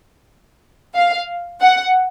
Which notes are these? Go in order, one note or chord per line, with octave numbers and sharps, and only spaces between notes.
F5
F#5